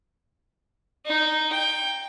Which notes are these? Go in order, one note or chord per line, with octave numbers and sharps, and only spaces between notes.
D#4
G5